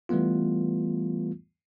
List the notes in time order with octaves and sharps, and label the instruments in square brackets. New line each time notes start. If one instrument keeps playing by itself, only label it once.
[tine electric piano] E3 G3 A3 B3 F4